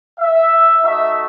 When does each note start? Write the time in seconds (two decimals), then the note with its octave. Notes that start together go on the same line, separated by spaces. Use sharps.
0.20 E5
0.84 A3 D#4 F#4 E5